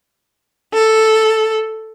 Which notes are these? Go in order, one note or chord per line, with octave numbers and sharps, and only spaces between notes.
A4